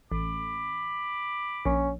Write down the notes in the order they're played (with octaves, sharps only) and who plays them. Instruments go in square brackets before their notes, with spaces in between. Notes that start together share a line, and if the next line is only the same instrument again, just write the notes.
[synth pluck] A1 [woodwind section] B5 D6
[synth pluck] A#1 [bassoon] C#4